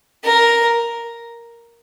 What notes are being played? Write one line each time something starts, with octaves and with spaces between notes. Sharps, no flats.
A#4